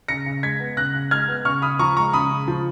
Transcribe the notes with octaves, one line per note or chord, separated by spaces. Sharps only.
C#3 A#6 C#7
C#3
G#3 G#6 B6
B3
C#3 F#6 A#6
C#3
G#3 F6 G#6
B3
C#3 C#6 F6
C#3 B5 D#6
F3 A#5 C#6
G#3 A#5 C#6
C#3 B5 D#6
C#3
F3